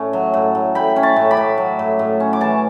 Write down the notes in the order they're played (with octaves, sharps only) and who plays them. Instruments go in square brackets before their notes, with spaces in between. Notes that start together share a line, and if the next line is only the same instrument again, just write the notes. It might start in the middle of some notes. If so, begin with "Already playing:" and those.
Already playing: [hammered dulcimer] A2 C#4
F#3
A2
A2
A2 G5 B5
C#4
A5 C#6
A2
B5 D6
A2
F#3
A2
A2
C#4
D6
E3 A5 C#6